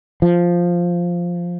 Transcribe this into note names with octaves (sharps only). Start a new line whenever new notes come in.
F3